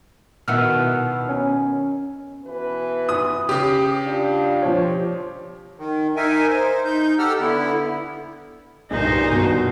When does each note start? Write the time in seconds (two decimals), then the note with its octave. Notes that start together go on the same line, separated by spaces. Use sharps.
0.48 B2 D#3 E4 F#5 E6 F6
1.29 C#4
2.45 B2 E3 B4
3.09 D#6
3.49 C#3 G4 D#6
4.05 D4 F4
4.62 F3 C#5
5.79 D#3
6.16 D#4 A#4 E5 G#5
6.48 C5
6.85 D#4 G6
7.18 G4 A4 F#5 E6 F6
7.40 D3 B3 E4
8.91 C2 G2 A#2 G#3 D#4 C5
9.32 G2 B2